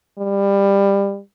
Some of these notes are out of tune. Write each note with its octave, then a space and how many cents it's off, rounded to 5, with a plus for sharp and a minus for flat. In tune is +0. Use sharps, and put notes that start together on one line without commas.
G3 +20